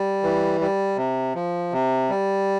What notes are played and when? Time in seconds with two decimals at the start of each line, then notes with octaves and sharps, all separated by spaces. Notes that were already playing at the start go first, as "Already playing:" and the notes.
Already playing: G3
0.23 E3
0.61 G3
0.97 C3
1.35 F3
1.73 C3
2.09 G3